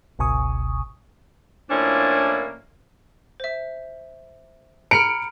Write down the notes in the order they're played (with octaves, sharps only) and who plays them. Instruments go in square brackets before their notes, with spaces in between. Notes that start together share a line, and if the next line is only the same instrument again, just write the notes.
[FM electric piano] G1 C#2 B2 G#5 C#6 D#6
[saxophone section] A2 F3 A#3 C#4 D4 E4
[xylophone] C5 E5
[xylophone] A#5 B5 F6 [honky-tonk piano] C#7 D7